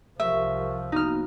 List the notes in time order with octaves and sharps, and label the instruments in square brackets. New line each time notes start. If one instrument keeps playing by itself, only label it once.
[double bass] C2 F3 [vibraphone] G4 A#4 C#6 [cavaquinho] E5
[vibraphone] A#3 B3 F#4 [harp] D#4 F6